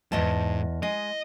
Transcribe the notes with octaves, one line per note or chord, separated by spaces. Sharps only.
E2 G#2 D#5 A5
G#3 D#5